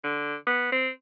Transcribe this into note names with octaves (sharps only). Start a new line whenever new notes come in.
D3
B3
C4